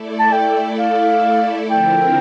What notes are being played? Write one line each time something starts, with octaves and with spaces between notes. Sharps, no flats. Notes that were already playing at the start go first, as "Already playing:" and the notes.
Already playing: A3 E4 A4 D5
A5
G5
F5
D3 F3 C4 E4 A#4 G5